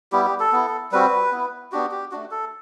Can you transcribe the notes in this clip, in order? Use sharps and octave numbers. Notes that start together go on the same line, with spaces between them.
G3 B3 E4 G4
G4
A4
B3 E4
G3 C4 F#4 B4
B3 E4
B3 D4 F#4 G4
G4
A3 D4 F#4
A4